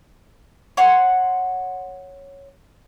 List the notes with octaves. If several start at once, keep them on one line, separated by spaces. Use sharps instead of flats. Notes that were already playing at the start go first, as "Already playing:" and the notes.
C#5 F#5 C6